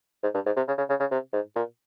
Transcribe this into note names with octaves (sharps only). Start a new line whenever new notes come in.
G#2
G2
G#2
C3
C#3
C#3
C#3
C#3
C3
G#2
A#2